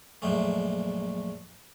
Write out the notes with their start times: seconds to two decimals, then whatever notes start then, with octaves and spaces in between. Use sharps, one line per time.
0.22 A#1 F#2 A#2 G#3 A3